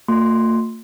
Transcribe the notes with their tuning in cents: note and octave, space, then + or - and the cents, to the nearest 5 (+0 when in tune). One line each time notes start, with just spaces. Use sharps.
A3 +45 F4 +35 C6 +0